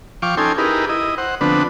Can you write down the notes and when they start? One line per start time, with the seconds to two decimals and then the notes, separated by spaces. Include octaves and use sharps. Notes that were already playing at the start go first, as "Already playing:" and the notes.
0.22 F3 F5 G5 C#6 D6
0.37 C#4 D#4 A4 G5 G#5 C6
0.58 D#4 E4 G4 G#4 A#4 B4
0.89 E4 D#5
1.18 C5 F#5
1.41 D3 F3 B3 C4 D4 B4